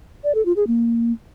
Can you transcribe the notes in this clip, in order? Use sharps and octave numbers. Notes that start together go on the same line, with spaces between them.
D5
A4
F4
G#4
A#3